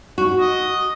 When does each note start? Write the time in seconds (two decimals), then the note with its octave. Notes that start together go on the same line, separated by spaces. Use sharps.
0.18 F#4
0.40 D#5